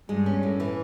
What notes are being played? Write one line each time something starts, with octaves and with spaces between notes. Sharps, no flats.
G2 G#3
C#4
A2
E3